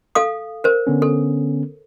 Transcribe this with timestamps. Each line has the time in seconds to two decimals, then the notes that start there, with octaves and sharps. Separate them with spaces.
0.15 A4 F5 D#6
0.64 A#4 C5
0.87 D3 B3 C#4
1.02 A4